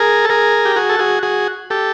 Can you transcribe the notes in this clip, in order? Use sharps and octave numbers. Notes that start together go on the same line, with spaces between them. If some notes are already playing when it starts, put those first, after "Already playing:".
Already playing: G#4 A#4
A4
G#4 A#4
G4
F#4 G#4
A4
F#4 G#4
F#4 G#4
G4 A4